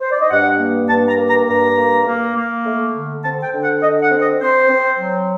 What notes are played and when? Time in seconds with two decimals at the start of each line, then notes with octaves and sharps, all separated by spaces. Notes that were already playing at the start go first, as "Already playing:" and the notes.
0.01 C5
0.11 D5
0.21 D#5
0.30 G2 F#5
0.60 A#3
0.89 G2 A5
1.08 A#5
1.18 A#3
1.28 A#5
1.48 G2 A#5
1.77 A#3
2.06 A#3
2.35 A#3
2.65 A3
2.93 D3
3.23 C4 A5
3.43 G5
3.53 D3
3.62 F#5
3.82 D3 D#5
4.02 F#5
4.11 C4
4.21 D#5
4.41 C4 C5
4.69 C4
5.00 F#3